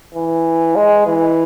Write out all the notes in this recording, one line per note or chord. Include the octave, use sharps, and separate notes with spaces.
E3
G#3
E3